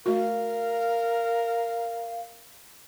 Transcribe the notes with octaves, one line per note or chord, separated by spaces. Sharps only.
A3 F#4 A#4 F5